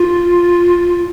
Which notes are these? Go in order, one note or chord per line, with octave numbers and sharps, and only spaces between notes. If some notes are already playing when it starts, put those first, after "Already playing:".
Already playing: F4